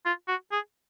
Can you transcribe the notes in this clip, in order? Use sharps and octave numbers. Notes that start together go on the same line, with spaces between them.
F4
F#4
G#4